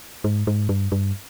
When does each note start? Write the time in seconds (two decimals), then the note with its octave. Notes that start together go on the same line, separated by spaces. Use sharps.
0.24 G#2
0.47 G#2
0.69 G2
0.92 G2